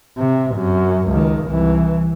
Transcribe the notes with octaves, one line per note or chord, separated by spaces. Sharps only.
C3
F#2
C#2 D#3
C2 E3